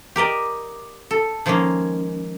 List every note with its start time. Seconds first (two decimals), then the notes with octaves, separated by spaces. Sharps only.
0.16 G4 A#4 D5 D#5
1.11 A4
1.46 D#3 F3 G#3 A#3 C#4